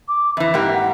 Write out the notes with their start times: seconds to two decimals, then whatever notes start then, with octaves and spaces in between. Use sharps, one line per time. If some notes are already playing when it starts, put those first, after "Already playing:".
0.08 D6
0.37 F2 E3 E5
0.54 G#2 A#3 G4
0.74 F#5